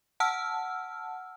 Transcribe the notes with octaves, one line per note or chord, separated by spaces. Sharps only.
F#5 A5 E6 F6